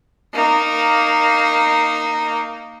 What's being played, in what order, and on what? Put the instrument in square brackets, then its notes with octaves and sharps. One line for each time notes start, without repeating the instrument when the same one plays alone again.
[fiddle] A#3 D#4